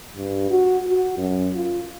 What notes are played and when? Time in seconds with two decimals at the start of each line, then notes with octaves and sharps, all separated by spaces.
0.17 G2
0.51 F#4
0.87 F#4
1.18 F#2
1.56 F4